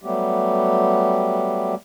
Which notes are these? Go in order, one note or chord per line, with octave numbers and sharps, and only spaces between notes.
F#3 G3 A3 B3 G4